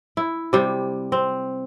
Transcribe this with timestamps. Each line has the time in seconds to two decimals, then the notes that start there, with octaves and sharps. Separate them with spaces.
0.17 E4
0.53 C3 G3
1.12 C4